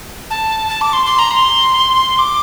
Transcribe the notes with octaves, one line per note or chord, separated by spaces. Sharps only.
A5
A5
D6
C6
C6
A#5
C6
D6